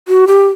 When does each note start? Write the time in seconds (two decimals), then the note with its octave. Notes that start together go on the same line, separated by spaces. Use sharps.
0.08 F#4
0.27 G4